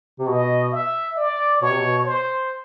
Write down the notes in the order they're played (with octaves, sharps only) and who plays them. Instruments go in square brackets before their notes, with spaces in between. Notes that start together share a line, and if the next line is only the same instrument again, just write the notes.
[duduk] C3
[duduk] B2 [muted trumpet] D#5
[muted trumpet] E5
D5
[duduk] B2 [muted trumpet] C#5
[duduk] C3
B2
[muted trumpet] C5